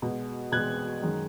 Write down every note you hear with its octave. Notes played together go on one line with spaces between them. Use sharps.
B2 G#3
B2 G#3 F#6 G#6
F#2 D#3 G#3